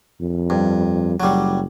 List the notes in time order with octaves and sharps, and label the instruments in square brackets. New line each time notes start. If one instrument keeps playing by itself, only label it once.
[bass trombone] F2
[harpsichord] G2
[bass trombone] F#1 [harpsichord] F#3 G3